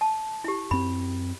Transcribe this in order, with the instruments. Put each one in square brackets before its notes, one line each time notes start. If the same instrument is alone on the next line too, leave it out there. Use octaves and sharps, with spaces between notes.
[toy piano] A5
E4 G4
[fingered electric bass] F#2 C4 [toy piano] B5